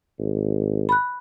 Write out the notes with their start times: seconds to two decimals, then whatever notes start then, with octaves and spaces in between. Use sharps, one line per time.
0.19 G#1
0.89 B5 F#6